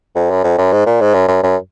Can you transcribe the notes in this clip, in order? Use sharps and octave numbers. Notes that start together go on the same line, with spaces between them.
F2
F#2
F2
F#2
G#2
A#2
G#2
F#2
F#2
F#2